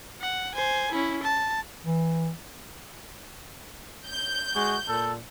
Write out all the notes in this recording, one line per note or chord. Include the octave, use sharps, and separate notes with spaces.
F#5
C5 G#5
C#4 E4
A5
E3
G6
G#3 F#4
A#2 A4